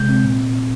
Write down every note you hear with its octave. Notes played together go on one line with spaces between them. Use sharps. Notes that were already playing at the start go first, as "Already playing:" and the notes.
Already playing: C3 G#3 G6
C4
A#2